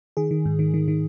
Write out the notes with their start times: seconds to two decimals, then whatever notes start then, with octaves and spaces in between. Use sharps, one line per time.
0.17 D#3 G#4
0.31 D#3
0.45 G#2
0.59 D#3
0.74 D#3
0.88 D#3